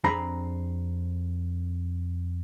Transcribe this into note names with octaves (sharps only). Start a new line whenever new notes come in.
F2 C4 D4 G#4 A#5 B5